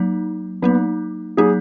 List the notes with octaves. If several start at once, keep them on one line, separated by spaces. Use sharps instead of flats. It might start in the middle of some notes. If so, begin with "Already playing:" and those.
Already playing: F#3 A#3 D#4
F#3 A#3 B3 D#4
F#3 A#3 D#4 G#4